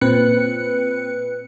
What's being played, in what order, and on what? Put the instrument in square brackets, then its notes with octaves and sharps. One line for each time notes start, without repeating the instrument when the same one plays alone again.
[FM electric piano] A#2 C4 B4 F#6 C#7